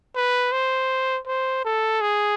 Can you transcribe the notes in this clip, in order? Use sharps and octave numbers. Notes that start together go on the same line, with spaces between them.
B4
C5
C5
A4
G#4